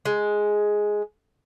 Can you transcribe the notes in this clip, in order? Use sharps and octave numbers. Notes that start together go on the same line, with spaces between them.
G#3